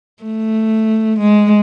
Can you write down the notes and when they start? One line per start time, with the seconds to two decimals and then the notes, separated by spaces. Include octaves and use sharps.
0.23 A3
1.19 G#3